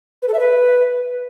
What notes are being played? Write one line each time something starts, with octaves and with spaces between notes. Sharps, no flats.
B4
A4
E5
B4